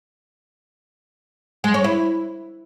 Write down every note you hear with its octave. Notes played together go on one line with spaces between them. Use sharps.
G#3
C#5
E4